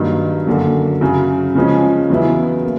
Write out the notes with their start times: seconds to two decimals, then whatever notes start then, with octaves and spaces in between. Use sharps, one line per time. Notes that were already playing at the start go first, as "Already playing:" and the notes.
Already playing: G2 D#3 F#3 A#3 D#4
0.47 F#2 D3 F#3 A#3
1.01 F#2 C#3 F#3
1.55 C#3 F3 G#3 C#4
2.10 E2 C#3 F#3 B3 E4
2.64 A#3